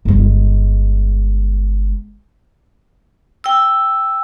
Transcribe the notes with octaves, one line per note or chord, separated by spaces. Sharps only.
G1 G#3
G5 E6